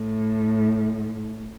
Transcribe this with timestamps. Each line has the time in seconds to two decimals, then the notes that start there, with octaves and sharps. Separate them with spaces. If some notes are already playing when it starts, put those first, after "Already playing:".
Already playing: A2